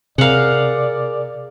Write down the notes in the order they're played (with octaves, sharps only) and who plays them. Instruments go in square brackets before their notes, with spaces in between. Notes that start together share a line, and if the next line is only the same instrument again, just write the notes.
[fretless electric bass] C3 [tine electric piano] G#4 A#4 [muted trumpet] D5 [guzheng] F5 F#5